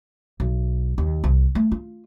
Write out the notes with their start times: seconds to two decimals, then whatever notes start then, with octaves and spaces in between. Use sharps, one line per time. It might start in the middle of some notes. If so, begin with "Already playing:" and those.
0.40 B1
0.98 D#2
1.24 C2
1.55 A3
1.72 F4